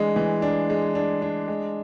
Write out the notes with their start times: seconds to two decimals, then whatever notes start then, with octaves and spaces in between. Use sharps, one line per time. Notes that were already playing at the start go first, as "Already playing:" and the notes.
Already playing: E3 G#3 D4
0.16 E3
0.42 D4
0.70 G#3
0.95 D4
1.22 D4
1.48 G#3